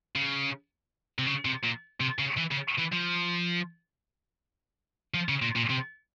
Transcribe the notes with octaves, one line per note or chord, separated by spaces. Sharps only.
C#3
C3
C#3
C3
A#2
C3
C#3
E3
C#3
E3
F3
F3
C#3
A#2
A#2
C3